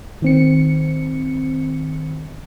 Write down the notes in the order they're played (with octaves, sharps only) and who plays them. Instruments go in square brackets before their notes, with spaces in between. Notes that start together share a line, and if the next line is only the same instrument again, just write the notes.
[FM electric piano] D#3 C4 C#7